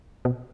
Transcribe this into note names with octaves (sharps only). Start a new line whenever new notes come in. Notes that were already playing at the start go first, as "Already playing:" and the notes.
B2